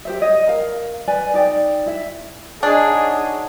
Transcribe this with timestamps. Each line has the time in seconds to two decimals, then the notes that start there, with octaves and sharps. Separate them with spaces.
0.05 G4 C5 E5
0.20 C#5 D#5
0.47 A#4 F5
1.07 B4 D5 G#5
1.34 D#4 D5 G5
1.86 E4 E5
2.63 D4 D#4 F#4 G#4 C#5